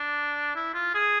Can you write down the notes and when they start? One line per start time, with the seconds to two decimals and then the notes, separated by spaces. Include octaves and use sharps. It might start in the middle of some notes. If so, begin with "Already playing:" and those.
Already playing: D4
0.55 E4
0.74 F4
0.94 G#4